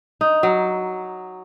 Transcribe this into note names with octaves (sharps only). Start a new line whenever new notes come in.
D#4
F#3